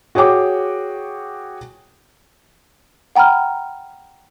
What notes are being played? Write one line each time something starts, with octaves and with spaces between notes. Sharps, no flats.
F#4 G#4 C#5 G5 D6
F#5 G5 A#5 B5 F6